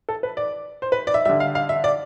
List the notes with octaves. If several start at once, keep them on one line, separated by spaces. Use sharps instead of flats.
A4
B4
D5
C5
B4
D5
E5
D3 G3 E5
F5
F5
E5
D5